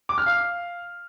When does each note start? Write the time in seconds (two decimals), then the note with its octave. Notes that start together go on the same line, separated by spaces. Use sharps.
0.09 D6
0.18 F6
0.26 F5